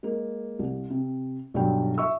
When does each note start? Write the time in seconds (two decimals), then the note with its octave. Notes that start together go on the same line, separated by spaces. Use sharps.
0.03 G#3 A#3
0.59 C2
0.90 C3
1.54 B1 G2 F#3 G5
1.98 E5 C#6 E6